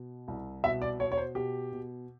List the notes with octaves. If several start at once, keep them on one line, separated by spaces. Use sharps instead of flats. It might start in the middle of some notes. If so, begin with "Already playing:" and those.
Already playing: B2
C2
B2 E5
D5
B2 C#5
C#5
C5
B2 G4
B2